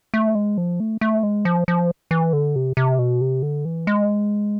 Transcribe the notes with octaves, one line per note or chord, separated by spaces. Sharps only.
A3
G#3
F3
A3
A3
G#3
F3
F3
E3
D3
C3
C3
B2
C3
D3
E3
G#3